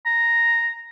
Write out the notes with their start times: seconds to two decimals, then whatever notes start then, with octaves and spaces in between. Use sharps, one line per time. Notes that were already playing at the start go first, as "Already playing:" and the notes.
0.05 A#5